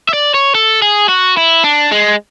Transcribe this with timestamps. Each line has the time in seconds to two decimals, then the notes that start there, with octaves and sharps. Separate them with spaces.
0.09 E5
0.13 D5
0.34 C#5
0.55 A4
0.82 G#4
1.09 F#4
1.38 E4
1.64 D4
1.92 G#3